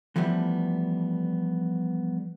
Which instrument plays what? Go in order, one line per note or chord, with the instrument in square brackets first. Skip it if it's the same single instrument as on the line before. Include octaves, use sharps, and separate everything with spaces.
[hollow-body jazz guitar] E3 F3 G3 A3 B3